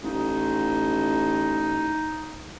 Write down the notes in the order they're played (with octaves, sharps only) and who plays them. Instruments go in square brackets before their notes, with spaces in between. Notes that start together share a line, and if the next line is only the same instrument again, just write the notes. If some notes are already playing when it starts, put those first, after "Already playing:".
[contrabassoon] A1 [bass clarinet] D#4